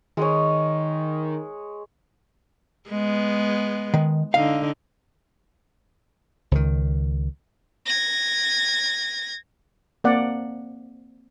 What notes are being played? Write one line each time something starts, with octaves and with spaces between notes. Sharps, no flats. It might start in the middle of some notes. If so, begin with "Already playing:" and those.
D#3 G#3 G#4 C#5
G#3 B3
D#3
D3 D#4 F5
C#2 D#3
G#6 A#6
A#3 C4 D5 F#5